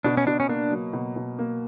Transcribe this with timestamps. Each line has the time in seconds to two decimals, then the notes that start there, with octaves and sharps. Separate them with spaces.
0.04 B2 D4
0.17 C#4
0.27 B2 D4
0.40 C#4
0.48 A#3 D4
0.71 F#3
0.93 B2
1.16 B2
1.38 A#3